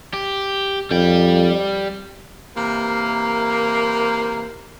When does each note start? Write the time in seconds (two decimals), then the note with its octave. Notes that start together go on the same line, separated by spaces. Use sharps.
0.14 G4
0.91 F2 G3 G5
2.56 C3 E3 A#3